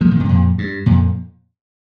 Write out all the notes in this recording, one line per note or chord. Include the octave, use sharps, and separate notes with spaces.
F3 A#3
A#2 D#3
G2 C3
F2 A#2
G2
F2 A#2